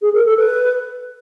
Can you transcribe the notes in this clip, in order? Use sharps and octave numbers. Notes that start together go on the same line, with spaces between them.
G#4
A#4
A4
B4